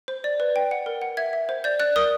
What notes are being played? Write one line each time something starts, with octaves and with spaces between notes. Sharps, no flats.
C5
D5
B4
G5
F#5
A#4
F#5
E5 G#6
E5
C5
D5 G6
D5 F#6
A#4 D#6